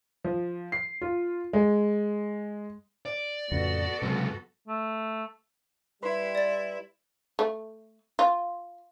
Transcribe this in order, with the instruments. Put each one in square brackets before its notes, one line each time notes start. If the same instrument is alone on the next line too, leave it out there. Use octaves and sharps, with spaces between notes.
[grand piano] F3
C7
F4
G#3
[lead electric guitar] D5
[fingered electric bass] F2 A2 C#3 [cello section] B3 F#4 A4
[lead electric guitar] C#2 F#2 [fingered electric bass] C3 F#3
[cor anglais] A3
[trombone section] G3 [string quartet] E4 [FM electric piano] B4 B5 C6
[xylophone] D5 A6
[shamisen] A3
F4